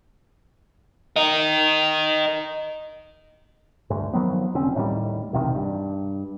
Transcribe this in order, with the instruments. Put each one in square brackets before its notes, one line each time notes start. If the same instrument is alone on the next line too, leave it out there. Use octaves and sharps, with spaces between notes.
[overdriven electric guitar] A#4 D#5
[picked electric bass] D2 G2
D#3 F3 F#3 B3
F1 D3 C4 C#4
D#2 A2 D#3 G3
B1 E2 C3 D#3
G2